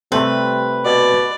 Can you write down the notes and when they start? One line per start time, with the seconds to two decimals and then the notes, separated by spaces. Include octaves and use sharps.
0.12 C3 G3 A3 C4 B4
0.85 B2 D5